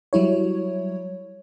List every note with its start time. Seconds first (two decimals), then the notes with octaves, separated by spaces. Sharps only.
0.13 F#3 G3 E4 C#5